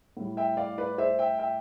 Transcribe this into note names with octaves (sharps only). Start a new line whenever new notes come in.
A2 G3
E5 G5
D5 F5
B4 D5
C5 E5
E5 G5
E5 G5